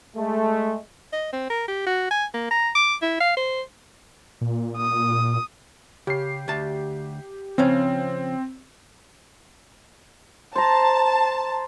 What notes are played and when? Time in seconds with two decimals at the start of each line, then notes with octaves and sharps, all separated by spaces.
0.17 G#3 A3
1.12 D#5
1.32 C4
1.50 A#4
1.68 G4
1.86 F#4
2.10 G#5
2.34 A#3
2.51 A#5
2.75 D6
3.02 E4
3.20 F5
3.37 C5
4.41 A#2
4.77 D#6
6.07 C#3 G4 C7
6.48 D2 A5
7.58 C#3 F3 C4 C#4
10.56 C5 A5 A#5